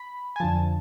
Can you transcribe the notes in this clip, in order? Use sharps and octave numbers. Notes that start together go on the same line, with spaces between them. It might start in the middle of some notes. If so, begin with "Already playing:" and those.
Already playing: B5
G#5
F2 D3 F3 A5